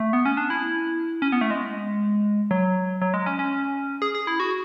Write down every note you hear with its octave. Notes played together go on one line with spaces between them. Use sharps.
A3
B3
C#4
D4
E4
C#4
B3
A3
G#3
F#3
F#3
G#3
C#4
C#4
G#4
G#4
E4
F#4